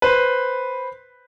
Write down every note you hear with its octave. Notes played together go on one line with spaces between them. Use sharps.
B4 C5